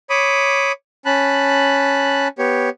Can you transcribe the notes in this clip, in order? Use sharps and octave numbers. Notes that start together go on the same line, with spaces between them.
C#5 B5 D6 D#6
C#4 A5 B5 F#6
B3 G4 C#5